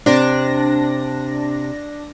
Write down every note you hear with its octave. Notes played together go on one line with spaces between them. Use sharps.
C3 D4 A#6